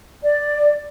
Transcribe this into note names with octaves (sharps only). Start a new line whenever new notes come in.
D5